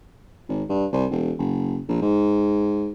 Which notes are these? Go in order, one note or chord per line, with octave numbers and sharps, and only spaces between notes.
G#1
G2
C2
E1
F#1
A#1
G#2